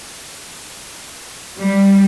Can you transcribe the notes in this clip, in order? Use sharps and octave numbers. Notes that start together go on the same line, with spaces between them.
G3